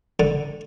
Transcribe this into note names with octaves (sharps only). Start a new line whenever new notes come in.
D3